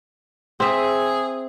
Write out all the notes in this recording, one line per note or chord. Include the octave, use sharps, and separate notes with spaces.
C4 G#4 E5